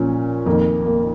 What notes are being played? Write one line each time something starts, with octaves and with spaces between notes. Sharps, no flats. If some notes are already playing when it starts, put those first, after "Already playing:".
Already playing: A#2 F3 C#4
F2 D#3 A#3
A#3